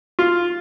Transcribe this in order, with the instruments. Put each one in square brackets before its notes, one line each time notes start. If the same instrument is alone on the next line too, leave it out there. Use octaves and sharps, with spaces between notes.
[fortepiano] F4